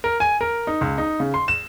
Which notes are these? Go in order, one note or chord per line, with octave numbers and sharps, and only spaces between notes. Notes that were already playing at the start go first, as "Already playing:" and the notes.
A#4
G#5
A#4
D#4
C#2
D#4
C#3
C6
E7